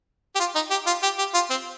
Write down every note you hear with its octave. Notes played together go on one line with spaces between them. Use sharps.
G4
F4
D#4
G4
F4
G4
G4
F4
C4